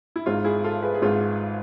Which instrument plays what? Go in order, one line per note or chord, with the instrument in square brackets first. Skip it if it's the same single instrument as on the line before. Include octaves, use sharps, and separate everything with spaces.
[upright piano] E4
G#1 G#2 G#3 F4
E4 G#4
F4 A4
G#4 B4
G#4
G#1 G#2 G#3 F4